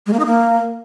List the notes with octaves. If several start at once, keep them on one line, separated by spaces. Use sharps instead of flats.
G#3
A#3
D#4
A#3